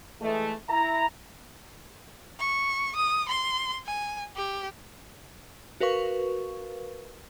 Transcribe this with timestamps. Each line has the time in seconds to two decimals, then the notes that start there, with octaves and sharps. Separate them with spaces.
0.20 E3 G#3 A3
0.69 E4 A#5
2.39 C#6
2.96 D#6
3.29 C6
3.86 G#5
4.37 G4
5.80 F#4 A#4 B4 F5 C#6